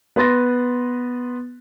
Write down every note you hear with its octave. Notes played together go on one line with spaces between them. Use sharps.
B3 B4 C6 A6 A#6